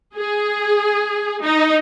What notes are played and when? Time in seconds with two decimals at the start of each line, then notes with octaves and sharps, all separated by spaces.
0.16 G#4
1.43 D#4